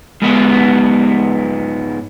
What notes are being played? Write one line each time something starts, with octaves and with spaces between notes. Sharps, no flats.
G#2 B3